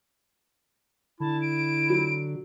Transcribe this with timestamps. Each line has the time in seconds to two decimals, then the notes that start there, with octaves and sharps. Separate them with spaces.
1.20 D3 E4 A5
1.42 D7
1.90 F#3